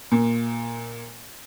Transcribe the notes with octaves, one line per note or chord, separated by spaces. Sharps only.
A#2